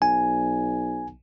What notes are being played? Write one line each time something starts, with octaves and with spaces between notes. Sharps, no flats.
B1 G#5